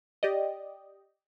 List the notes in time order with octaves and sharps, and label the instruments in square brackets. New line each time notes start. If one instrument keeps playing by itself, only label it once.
[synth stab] G4 D5 D#5